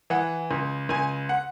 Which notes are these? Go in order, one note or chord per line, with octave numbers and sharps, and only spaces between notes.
E3 F#5
C#2
C#2 G#5
F#5